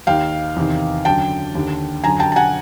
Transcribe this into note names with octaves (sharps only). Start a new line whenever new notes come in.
D#2 D#3 F5 G5
E2 C3 D#3
F#2 D3 G5 A5
D#2 D3
F#2 D3 G#5 A#5
G5 A5
A5
F#5 G#5